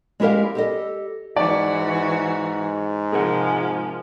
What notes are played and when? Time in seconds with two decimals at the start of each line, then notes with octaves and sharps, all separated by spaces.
0.20 G#3 E4 G4 A#4 F5
0.55 G4 A4 D#5
1.36 G#2 E3 F#4 D5
3.13 C3 F3 G#3 G#4 A#4 F#5